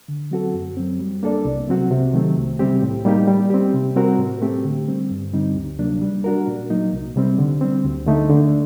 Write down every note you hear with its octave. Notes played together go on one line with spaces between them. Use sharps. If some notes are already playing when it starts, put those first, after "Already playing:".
D3
F#3 C4 F#4 A4
F#2
F#3 C4
G3
A#3 D4 A4 D5
C2
C3 F#3 C4 F#4
C3
D#3 F#3 A3 C4
C2
C3 G3 C4 G4
A2
G3 A#3 D#4 G4
G3
C4 G4
C3
G3 C4 F#4 A#4
A2
A3 C4 G4
D3
G3 C4
G2
D3 G3 C4 D#4
D2
C3 F#3 A#3 D4
G3
D4 F#4 A#4
A#2
F#3 A#3 D#4
C2
C3 G3 C4
D3
G3 C4
D2
D3 A3 D#4
D3